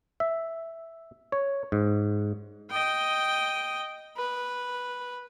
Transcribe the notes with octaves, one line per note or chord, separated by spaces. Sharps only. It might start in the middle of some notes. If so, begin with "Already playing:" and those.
E5
C#5
G#2
D#5 G5
B4